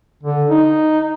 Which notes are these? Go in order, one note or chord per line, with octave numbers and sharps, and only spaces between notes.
D3
D#4